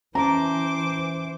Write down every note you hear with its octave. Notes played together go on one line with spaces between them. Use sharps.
E3 C#4 C5 A5 A#5 D6